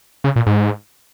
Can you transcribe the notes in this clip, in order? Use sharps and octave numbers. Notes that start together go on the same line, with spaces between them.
C#3
A#2
G#2